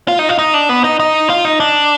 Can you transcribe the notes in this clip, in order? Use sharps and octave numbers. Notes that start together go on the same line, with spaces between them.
F4
D#4
F4
D#4
D4
B3
D#4
D#4
F4
D#4
D4